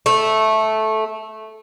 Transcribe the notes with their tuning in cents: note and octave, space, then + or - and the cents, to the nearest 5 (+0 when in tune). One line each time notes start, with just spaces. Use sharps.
A3 -10